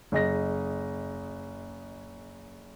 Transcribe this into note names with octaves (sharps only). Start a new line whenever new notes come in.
F#1 D#5 A#6